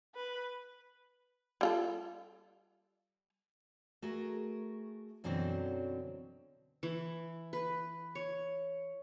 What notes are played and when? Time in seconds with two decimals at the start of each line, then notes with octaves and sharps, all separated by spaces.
0.15 B4
1.61 G3 F4 A4
4.02 A3 F#4 G#4 A#4
5.24 F#2 B2 D3 E3 F#3 C4
6.83 E3
7.53 B4
8.15 C#5